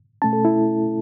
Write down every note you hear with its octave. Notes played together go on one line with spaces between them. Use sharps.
B2 A3 C#4 A5
A4
E4